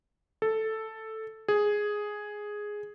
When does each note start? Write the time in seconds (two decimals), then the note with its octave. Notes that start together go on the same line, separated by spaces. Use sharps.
0.42 A4
1.48 G#4